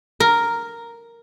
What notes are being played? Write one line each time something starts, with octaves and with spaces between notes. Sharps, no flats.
A#4